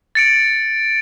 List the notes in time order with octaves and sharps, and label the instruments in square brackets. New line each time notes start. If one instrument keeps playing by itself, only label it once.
[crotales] A6 C#7 D7